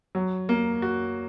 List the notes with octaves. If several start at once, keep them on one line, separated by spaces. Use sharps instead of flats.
F#3
A#3
F#4